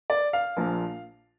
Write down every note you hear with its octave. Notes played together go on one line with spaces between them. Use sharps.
D5
F5
A#1 A#2 F3